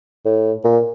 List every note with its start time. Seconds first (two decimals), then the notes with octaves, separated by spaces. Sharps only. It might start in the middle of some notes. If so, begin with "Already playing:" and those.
0.25 A2
0.64 A#2